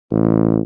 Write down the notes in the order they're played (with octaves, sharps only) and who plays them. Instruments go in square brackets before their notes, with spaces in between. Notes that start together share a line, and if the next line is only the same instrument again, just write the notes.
[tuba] A1